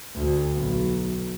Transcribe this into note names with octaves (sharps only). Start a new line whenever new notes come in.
D2
B1